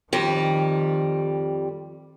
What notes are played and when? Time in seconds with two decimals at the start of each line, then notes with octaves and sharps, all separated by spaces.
0.13 F2 D#3 G3